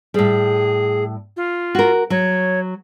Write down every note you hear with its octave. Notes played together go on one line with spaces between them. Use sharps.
A2 G3 G#4
F4
F#4 A#4
F#3 C#5